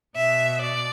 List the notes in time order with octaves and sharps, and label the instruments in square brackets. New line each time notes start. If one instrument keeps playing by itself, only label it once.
[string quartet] B2 E5
D5